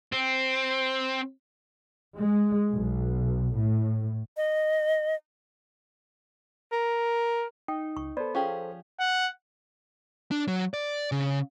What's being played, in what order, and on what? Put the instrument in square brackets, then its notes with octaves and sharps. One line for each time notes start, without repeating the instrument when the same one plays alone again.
[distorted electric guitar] C4
[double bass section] G#3
B1
A2
[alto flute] D#5
[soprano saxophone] A#4
[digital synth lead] D#4 [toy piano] G5
[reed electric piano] C#2 [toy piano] C#6
[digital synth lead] B3 [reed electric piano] A4 C5 [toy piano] D5
[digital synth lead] F3 [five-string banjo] C#4 G4 G#4
[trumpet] F#5
[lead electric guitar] D4
F#3
D5
C#3